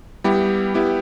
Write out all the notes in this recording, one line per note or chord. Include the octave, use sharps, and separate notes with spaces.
G3 B3 E4 G4
G3 B3 E4 G4